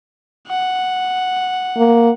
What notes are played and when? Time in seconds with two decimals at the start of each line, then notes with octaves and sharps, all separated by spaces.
0.48 F#5
1.77 A#3